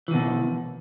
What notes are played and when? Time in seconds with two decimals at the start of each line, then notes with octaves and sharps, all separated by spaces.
0.08 E3
0.11 D#3
0.14 B2